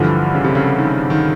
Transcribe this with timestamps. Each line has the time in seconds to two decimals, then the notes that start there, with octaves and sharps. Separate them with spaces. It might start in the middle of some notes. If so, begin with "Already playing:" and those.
Already playing: G2 D3 E3 F3
0.35 C#3
0.44 C3
0.55 C#3
0.79 D#3
1.10 D#3